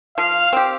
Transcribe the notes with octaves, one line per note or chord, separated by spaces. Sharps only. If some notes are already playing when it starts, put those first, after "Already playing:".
F3 F5
C4 G4